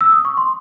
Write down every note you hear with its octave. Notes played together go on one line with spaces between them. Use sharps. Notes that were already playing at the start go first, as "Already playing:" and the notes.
E6
D#6
C#6
C6